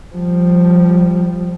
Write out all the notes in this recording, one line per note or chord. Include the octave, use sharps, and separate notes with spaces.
F3 G3